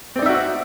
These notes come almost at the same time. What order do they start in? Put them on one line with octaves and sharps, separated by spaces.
C4 D5 D#4 E5 F#4